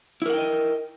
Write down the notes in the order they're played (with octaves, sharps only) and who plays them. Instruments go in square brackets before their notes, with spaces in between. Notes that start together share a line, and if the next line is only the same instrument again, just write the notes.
[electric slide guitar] E4
A#4
F#5
G5
D#5